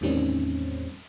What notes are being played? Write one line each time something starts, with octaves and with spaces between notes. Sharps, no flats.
E2 A2 D#3 G3 C4 C#4